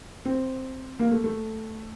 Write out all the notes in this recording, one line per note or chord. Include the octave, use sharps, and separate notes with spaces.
C4
A#3
A3
A3